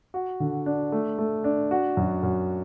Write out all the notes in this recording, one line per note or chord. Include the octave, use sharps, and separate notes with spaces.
F#4
D3
D4
A3
A3
D4
F#4
F#2
F#2